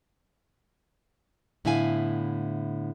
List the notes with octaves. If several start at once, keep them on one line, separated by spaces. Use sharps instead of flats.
A2 D3 B3 E4 F5 G#5